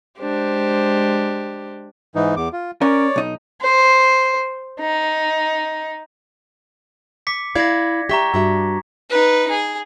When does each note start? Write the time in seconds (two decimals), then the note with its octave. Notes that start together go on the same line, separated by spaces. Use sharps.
0.20 G#3 D4 G4 C5
2.15 G#2 E3 D#4
2.37 E2 D6
2.53 F4
2.81 C#4 A#4 C#5 D5
3.16 B1 D#4
3.62 C5
4.80 D#4
7.27 D6 B6 C#7
7.55 E4 D5 F5 G#6 A#6
8.09 G4 E5 A#5 C#6 B6
8.34 G2 F#4 E5
9.10 D#4 B4
9.50 G#4